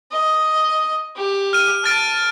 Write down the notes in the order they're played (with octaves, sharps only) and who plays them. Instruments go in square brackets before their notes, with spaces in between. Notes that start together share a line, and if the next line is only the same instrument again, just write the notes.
[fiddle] D#5
G4
[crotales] F6 D#7
[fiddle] A5 [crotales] F6 A6 D7